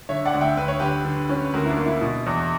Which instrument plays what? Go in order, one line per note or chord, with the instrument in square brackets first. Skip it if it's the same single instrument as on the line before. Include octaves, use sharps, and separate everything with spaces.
[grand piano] D3 [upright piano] C#5 E5
[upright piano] D5 F#5
[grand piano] D2
[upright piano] E5 G5
[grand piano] D2 [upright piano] B4
[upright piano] C#5
[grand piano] D3 [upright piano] G4 B4
[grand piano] D3
C#4
[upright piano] B4
[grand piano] D2 [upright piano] F#4 A#4
[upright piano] E4
D4
[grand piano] A#3
[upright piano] E4
[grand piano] B2 [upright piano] E4
[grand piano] E2